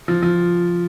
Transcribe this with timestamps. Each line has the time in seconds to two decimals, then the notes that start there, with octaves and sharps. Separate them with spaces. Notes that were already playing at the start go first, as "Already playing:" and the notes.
0.08 F3
0.23 F3